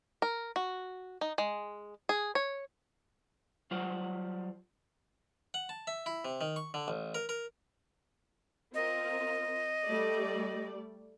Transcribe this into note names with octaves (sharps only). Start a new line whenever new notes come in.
A#4
F#4
D#4
G#3
G#4
C#5
F#3 G3 F4 C5 F#5
F#5
A5
E5
E4
C3
D#3
C#6
D3
A1
A#4
A#4
C4 F4 A#4 D#5
G3 A3 D5